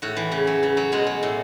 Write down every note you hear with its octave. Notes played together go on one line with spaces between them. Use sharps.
A2 F#4
E3
C#3
F#3
C#3
F#3
B2 G#3
F#3
A2